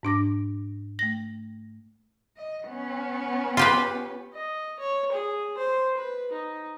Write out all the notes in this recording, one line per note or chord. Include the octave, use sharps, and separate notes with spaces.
G#2 D4 D6 A#6
A3 A#6
D#5
B3 C#4
F4 G4 B4
D#5
C#5
G#4
C5
B4
D#4